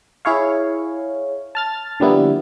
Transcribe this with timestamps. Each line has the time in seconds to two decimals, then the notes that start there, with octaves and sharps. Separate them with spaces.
0.25 E4 G#4 C#5 F5
1.55 A5 F6 A6
2.00 D3 F3 G3 A#3 B3 E4